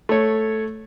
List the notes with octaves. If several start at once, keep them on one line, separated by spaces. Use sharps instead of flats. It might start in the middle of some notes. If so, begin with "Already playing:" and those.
A3 C#5